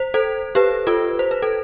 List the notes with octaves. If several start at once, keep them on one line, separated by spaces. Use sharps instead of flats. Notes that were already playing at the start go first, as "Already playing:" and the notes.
Already playing: C5
A4 C5
G4 B4
F4 A4
C5
B4
A4